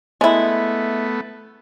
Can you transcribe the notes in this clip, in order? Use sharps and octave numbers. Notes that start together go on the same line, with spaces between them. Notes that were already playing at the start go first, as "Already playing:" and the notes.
G#3 A3 B3 E4